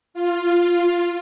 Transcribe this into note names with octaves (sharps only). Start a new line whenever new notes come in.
F4